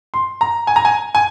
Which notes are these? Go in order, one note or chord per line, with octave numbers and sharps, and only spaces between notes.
C6
A#5
G#5
A#5
G#5
G#5